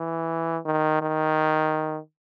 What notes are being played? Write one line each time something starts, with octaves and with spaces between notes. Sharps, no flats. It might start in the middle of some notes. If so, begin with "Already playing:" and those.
Already playing: E3
D#3
D#3